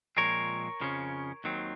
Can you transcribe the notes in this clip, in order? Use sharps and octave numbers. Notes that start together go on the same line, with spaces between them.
A#2 F3 G#3 C4 A#4 C#5
F2 C#3 F3 A#3 C#4
D#2 D#3 F#3 C4